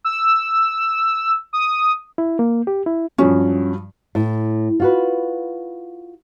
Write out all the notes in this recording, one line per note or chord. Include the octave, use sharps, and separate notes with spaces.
E6
D#6
E4
A#3
G4
E4
G2 F3 F#3 C#4
A2
F4 F#4 B4